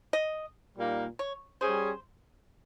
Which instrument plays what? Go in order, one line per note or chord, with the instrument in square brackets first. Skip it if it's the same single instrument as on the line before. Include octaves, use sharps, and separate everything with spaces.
[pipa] D#5
[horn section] A#2 G3 A#3 D#4
[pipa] C#5
[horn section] G3 C#4 G#4 [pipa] C5